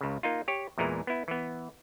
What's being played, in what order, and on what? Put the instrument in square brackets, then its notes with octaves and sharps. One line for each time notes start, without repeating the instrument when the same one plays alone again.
[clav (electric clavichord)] C#2 C#3
A#3 D#4 F4
G4 C#5
E2 A#2 E3 G#3 A#5
B3 E4
E3 B3